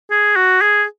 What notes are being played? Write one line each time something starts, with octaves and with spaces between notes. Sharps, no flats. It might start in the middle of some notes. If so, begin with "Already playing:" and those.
G#4
F#4
G#4